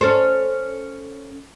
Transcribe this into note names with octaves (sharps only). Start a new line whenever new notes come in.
C#4 A4 C5